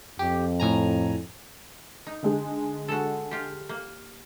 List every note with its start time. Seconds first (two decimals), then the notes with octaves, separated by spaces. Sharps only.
0.19 F2 G4
0.60 A2 G#5 A#5
2.07 D#4
2.23 D3 G#3 G#4
2.88 F#4 A4
3.31 F4 G4
3.69 A#3